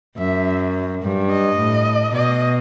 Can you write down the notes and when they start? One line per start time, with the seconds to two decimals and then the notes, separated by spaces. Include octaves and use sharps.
0.18 F#2 E5
1.03 G2
1.31 D#5
1.58 A2
2.14 B2 D#5